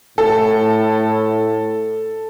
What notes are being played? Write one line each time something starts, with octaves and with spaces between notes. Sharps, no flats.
A2 A4